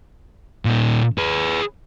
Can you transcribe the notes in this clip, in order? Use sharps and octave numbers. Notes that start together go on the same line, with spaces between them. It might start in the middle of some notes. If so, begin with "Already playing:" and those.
A#2 D#4
G#4 B4